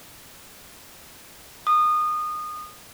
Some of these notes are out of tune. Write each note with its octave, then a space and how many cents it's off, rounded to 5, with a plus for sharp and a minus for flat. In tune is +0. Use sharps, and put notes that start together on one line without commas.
D#6 -25